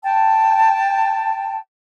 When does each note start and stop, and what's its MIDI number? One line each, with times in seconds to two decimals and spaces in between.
0.03 1.58 79
0.03 1.58 81